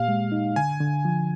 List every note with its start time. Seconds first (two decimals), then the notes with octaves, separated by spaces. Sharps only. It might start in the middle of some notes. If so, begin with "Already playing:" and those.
Already playing: A#2 A#3 G4 F5
0.08 G#3
0.32 D#4
0.56 D3 G#5
0.81 D3
1.05 F3